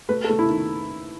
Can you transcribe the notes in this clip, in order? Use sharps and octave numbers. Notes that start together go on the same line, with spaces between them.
A3 B4
A4
A3
E4
D#3